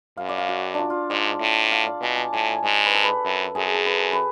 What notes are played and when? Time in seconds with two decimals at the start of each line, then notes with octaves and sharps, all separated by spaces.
0.17 F#2 F5
0.29 D5
0.38 F5
0.49 F#4
0.74 D4 F4
0.90 F4
1.10 G#2 D5
1.41 A2
1.72 F5
1.87 D5
2.02 B2 G#5
2.17 A5
2.33 A2 G#5
2.48 A5
2.64 G#2 G#5
2.86 B4
2.95 A4
3.04 B4
3.25 F#2
3.55 F#2 G#4
3.74 A4
3.87 B4
4.13 B4